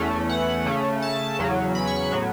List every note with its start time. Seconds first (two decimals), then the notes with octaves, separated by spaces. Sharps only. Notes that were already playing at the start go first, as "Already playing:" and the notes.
Already playing: E2 E3 A3 C#4
0.29 F#5
0.66 C#3 A3 C#4
1.02 A5
1.39 E2 C#3 F#3 C#4
1.75 B5
1.87 C#6
2.12 A2 F#3 B3